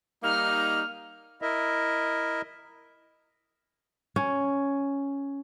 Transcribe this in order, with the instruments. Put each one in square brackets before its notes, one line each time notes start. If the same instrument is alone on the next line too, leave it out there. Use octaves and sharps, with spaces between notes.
[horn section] G3 A#3 D#4 [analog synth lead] F6
[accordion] E4 A#4 D#5 E5
[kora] C#4